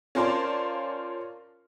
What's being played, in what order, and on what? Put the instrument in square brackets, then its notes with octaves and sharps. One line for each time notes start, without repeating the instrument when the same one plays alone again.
[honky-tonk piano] C#4 F4 A#4 C5 D5 A5